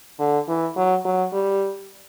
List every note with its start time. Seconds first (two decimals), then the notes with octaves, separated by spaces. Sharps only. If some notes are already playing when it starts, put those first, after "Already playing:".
0.19 D3
0.48 E3
0.76 F#3
1.05 F#3
1.33 G3